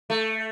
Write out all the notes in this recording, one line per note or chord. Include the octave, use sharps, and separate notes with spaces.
A3